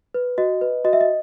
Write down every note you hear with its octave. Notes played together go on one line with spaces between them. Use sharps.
B4
F#4 D#5
B4
F#4 D#5
E5
D#5